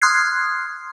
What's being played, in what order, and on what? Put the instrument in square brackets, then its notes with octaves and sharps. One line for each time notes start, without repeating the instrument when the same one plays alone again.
[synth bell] C6 D#6 F6 F#6 G#6 C7